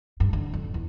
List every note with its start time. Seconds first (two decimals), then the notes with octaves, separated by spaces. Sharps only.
0.20 G2
0.33 D3
0.54 F2
0.74 E2